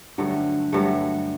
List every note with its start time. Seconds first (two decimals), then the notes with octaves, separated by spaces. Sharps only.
0.18 G2 D3 F#3 A3
0.73 G2 F#3 A3